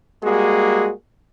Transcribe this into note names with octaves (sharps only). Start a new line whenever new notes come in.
G3 G#3 A#3 F#4 G#4